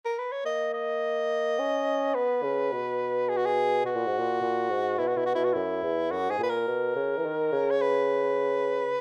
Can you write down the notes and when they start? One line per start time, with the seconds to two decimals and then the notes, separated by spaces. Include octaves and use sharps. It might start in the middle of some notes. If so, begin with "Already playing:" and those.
0.05 A#4
0.19 B4
0.32 C#5
0.45 A#3 D#5
0.73 D#5
1.59 C#4
2.15 B3 B4
2.43 C#3
2.72 B2
3.29 G#4
3.37 F#4
3.46 G#4
3.84 B2 F#4
3.96 A#2
4.07 G#2
4.19 A#2
4.42 A#2
4.70 G#2
4.98 B2 E4
5.07 F#4
5.17 B2 E4
5.26 F#4
5.35 B2 E4
5.44 F#4
5.53 F#2 E4
5.83 E2
6.11 F#2 F#4
6.29 G#2 G#4
6.39 A#2 B4
6.49 A#4
6.67 B2
6.96 C#3
7.17 E3
7.25 D#3
7.53 C#3
7.70 C#5
7.81 B4